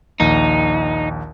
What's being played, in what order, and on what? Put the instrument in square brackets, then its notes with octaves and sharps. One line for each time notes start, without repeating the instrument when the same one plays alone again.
[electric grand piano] A#1 D#2 D#7 [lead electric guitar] D#4